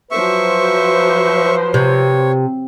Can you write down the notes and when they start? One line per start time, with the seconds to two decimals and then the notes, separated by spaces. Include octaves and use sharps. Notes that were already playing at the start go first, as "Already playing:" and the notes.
0.11 F3 F#3 B4 C5 E5 C#6
1.74 C3 C#5